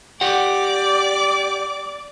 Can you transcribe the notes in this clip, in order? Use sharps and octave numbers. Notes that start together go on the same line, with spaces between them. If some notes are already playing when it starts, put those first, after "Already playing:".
G4 D5 F#5 D6